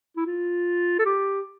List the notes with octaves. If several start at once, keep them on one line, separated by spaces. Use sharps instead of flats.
E4
F4
A4
G4